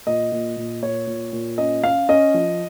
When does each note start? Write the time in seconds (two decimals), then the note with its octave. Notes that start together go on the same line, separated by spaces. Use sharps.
0.07 A#2 D#5
0.32 A#2
0.57 A#2
0.83 A#2 C#5
1.07 A#2
1.33 A#2
1.58 C#4 D#5
1.83 C#4 F5
2.09 C#4 D#5
2.34 F3